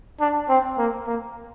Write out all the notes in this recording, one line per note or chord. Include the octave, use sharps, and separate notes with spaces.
D4
C4
A#3
A#3